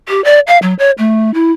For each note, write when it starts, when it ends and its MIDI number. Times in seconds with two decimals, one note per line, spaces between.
0.09 0.23 67
0.24 0.39 74
0.47 0.58 77
0.62 0.74 54
0.79 0.91 73
0.98 1.33 57
1.34 1.52 64